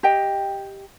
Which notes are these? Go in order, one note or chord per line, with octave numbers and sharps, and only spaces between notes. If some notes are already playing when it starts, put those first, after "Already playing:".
G4 D#5 G5